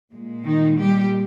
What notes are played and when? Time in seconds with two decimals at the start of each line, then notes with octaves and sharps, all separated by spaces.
0.12 A#2 G#3
0.45 D#3 D#4
0.79 G3 G4